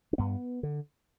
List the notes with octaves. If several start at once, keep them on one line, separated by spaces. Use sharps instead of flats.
D4
G2 B3
D3